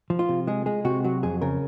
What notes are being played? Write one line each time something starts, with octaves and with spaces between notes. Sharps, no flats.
F3
F4
C3
G#3 G#4
G#3 G#4
C3 F#4
F#3 F#4
F2 G#4
C#3 A#4